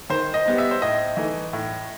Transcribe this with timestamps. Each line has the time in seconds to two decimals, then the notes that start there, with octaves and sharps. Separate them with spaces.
0.10 D#3 C5
0.34 D#5
0.45 G3 B3 D#4
0.58 E5
0.71 C5
0.82 A2 D#5
1.17 E3 A3 D#4
1.53 A2